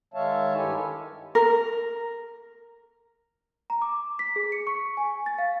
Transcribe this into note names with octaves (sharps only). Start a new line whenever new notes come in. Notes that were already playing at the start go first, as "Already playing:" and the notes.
D#3 G#3 C#5 E5 F5 A5
G2 D#3 E4 G4 A4 G#5
A#4
A#5
D6
B6
G#4
C#7
C#6
G#5
A6
F5